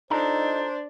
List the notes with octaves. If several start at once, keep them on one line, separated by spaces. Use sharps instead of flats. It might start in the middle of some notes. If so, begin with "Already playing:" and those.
D4 D#4 F4 A4 C5 A#5